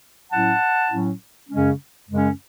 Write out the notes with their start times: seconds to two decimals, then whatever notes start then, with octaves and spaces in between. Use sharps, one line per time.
0.31 A2 F#3 C#4 E4 F#5 A5
0.90 A2 F#3 C#4 E4
1.49 F#2 C#3 G#3 C#4
2.08 F#2 C#3 G#3 C#4